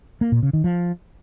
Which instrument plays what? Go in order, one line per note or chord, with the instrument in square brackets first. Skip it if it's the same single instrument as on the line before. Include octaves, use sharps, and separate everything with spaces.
[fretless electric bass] A#3
A#2
C#3
D#3
F3